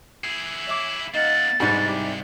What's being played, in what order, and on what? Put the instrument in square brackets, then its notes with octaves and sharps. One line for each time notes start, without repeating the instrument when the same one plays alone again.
[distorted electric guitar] E4 G#4
[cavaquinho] C#5 E5 D6
[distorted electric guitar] A#3 F#5 [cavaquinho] D#4 F5 [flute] A6
[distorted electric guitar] C2 [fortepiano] G#2 G3 [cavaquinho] B4 F#5 C#6
[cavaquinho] E4 G4